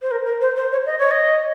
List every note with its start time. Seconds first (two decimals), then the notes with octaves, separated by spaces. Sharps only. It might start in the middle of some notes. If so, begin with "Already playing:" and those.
0.02 C5
0.11 A#4
0.26 A#4
0.41 C5
0.56 C5
0.72 C#5
0.86 D#5
0.99 C#5
1.11 D#5